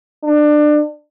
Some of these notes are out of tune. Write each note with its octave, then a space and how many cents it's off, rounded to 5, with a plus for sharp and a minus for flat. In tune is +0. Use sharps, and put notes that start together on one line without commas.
D4 +25